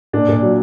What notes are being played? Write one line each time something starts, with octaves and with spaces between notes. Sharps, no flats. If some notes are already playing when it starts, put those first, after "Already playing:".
A#2 D4
A#2
F#3